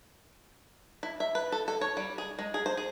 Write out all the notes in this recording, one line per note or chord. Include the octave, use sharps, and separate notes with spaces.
E4
E5
B4
A4
A4
C#5
G3
G#4
G#3
G#4
C5
G#4